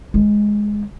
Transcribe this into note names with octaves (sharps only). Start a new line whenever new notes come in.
G#3